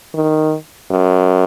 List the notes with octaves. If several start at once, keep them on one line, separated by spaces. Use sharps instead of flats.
D#3
F#2